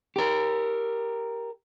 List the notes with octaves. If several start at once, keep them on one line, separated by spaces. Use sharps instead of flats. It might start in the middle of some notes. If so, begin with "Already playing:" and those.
G4 A#4